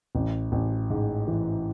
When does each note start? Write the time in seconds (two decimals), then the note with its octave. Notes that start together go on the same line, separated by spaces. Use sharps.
0.15 A1
0.52 A1
0.90 G#2
1.28 E3